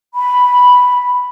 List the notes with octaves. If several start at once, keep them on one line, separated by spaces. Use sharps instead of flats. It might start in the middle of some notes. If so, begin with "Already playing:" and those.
B5